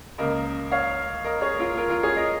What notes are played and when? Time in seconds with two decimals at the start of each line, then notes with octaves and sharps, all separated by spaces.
0.18 C#2 C#3 A#3 A#4 D#5
0.72 C#5 F5
1.25 A#4 D#5
1.41 G#4 C#5
1.59 F4 A#4
1.77 F4 A#4
1.90 F4 A#4
2.03 G#4 C#5
2.16 A#4 D#5